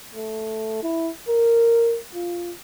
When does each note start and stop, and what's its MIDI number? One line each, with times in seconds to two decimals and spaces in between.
0.15 0.78 57
0.83 1.10 64
1.28 1.97 70
2.14 2.51 65